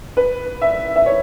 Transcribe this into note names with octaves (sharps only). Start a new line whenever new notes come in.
B4
E5
E5
C#5